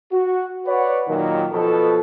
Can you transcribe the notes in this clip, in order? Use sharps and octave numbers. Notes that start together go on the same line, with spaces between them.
F#4
B4 C#5 D5 F#5
A#2 D#3 F#3
B2 F3 A4